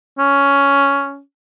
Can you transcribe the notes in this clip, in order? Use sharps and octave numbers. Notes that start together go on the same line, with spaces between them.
C#4